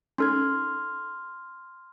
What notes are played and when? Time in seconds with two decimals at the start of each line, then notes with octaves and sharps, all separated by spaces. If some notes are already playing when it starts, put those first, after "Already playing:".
0.18 C#4 D#4 A4 C6 F6 G#6